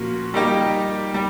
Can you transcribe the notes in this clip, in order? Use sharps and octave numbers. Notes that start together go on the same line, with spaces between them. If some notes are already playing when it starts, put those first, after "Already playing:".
Already playing: A#2 F3 A#3 C#4 F#4
G3 A#3 D#4 G4
G3